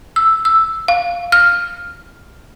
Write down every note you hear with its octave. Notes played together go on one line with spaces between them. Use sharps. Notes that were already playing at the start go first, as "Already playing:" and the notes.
E6
E6
F5
F6